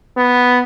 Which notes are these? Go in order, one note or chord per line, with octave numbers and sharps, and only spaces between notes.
B3